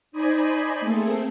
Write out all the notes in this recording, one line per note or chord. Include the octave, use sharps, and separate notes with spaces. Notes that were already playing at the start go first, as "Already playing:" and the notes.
D#4 C5 D5 D#5 G#5 B5
A3 A#3 C4 G#4 A4